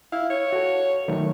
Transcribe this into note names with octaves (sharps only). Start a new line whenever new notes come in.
E4 F5
C#5
F#4 A4
D#3 F#3 A3